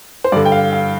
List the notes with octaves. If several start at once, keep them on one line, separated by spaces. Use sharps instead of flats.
C5
G2 D3 D5
G5
F5
F5